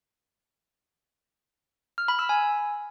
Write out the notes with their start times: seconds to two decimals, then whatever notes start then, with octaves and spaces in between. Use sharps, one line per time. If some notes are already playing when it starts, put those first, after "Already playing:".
1.98 F6
2.08 B5
2.19 E6
2.29 G#5